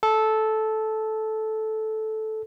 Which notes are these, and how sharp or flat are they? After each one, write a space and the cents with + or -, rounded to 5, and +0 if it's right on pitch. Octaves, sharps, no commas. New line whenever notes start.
A4 -10